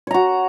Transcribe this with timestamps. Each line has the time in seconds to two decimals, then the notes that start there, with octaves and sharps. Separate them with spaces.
0.07 C#5
0.11 A#5
0.14 F#4